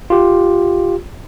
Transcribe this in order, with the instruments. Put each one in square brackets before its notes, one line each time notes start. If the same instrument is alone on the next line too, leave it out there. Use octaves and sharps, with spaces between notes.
[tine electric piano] F4 G4